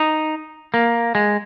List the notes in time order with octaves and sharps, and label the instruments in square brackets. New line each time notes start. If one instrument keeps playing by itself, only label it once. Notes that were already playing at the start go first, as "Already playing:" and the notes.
Already playing: [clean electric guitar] D#4
A#3
G#3